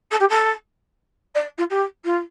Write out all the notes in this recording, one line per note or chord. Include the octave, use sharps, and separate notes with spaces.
A4
G4
A4
D5
F4
G4
F4